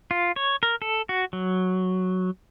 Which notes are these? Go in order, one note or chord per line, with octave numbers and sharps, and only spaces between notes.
F4
C#5
A#4
A4
F#4
F#3